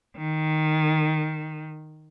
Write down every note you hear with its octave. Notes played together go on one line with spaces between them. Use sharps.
D#3